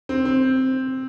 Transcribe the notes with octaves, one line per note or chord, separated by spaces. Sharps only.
C4
C4